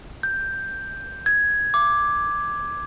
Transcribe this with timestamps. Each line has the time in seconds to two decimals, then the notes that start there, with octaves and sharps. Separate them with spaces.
0.23 G6
1.26 G#6
1.74 D6